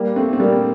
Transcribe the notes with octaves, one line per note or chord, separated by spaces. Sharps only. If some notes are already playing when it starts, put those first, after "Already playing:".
Already playing: G3 A#3
A3 C4
C4
G3 A#3